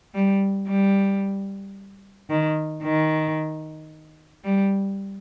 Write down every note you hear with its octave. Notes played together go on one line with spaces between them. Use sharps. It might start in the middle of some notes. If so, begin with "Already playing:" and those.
G3
G3
D#3
D#3
G3